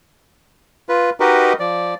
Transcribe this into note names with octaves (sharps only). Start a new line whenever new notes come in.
F4 B4
D#4 F#4 G4 A#4 B4 D#5
F3 D5